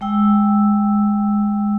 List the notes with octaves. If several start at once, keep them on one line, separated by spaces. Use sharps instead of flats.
G#3 G5 E6